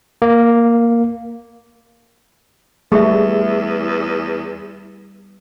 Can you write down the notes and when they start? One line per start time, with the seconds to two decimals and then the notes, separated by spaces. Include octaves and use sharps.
0.22 A#3
2.92 E2 G3 A3 G#4 E5